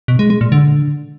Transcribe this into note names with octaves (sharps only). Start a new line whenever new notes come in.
B2
G#3
G#3
A#2
D3